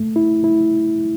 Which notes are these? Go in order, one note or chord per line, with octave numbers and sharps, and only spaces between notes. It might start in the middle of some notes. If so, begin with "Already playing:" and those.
Already playing: A3
E4
E4